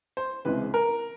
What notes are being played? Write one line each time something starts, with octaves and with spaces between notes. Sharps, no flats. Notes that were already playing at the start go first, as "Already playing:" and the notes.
C5
C#2 C3 E3 G#3 B4
A#4